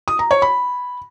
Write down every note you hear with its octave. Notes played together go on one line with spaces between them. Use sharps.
D#6
A#5
C#5
B5